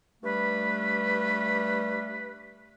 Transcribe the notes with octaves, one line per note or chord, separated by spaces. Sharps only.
G2 G3 A3 B4